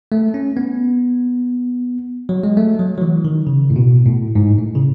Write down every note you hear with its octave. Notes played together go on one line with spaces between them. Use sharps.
A3
C#4
B3
F#3
G#3
A3
F#3
F#3
E3
D#3
C#3
A2
B2
A2
G#2
A2
C#3